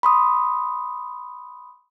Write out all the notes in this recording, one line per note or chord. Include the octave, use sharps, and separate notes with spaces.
B5 C6 D#6